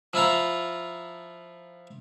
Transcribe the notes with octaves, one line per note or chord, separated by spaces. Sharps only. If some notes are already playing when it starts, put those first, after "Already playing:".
F3 E4 F4 A#5